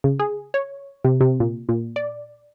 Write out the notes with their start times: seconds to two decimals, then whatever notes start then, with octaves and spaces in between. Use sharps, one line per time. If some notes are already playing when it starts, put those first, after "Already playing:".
0.04 C#3
0.20 G#4
0.54 C#5
1.04 C3
1.21 C3
1.40 A#2
1.69 A#2
1.96 D5